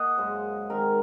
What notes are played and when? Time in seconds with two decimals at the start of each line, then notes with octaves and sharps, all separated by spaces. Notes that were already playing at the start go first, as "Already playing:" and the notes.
Already playing: A#3 D#5 F#5 G#5
0.17 F#2 C#3 G#3 C5
0.70 D#3 G#3 C4 A#4